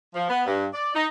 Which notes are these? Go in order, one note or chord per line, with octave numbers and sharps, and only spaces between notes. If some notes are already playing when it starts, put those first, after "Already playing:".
F3
B3
G2
D5
D#4